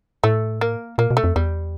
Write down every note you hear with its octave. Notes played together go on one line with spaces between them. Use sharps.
A2 A3
A#3
A#2 A#3
B2
A3
F2
E2 G3